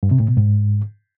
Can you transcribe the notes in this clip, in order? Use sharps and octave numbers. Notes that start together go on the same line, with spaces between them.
G2
C3
A2
B2
G#2